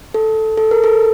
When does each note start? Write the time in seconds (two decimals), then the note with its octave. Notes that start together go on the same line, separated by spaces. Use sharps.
0.14 A4
0.58 A4
0.71 A#4
0.84 A4